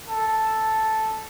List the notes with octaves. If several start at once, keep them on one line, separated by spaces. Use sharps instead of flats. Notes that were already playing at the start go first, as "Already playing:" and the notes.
A4